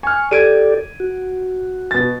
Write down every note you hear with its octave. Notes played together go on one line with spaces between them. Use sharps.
G#5 C#6 F6
G4 A4 D5 G#6 D7 D#7
F#4
B2 A6